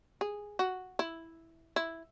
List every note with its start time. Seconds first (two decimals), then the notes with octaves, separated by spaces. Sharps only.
0.21 G#4
0.59 F#4
0.99 E4
1.76 E4